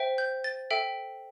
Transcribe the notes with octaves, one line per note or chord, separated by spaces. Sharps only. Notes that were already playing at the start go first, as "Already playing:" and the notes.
Already playing: C5 E5 G5
G6
A6
A4 E5 G5